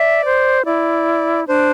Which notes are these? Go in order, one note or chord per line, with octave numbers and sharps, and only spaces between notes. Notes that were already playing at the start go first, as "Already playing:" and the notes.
Already playing: D5 E5
C5
E4 D5
D4 C5